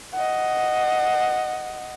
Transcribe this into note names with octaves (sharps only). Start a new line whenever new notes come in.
D#5 F#5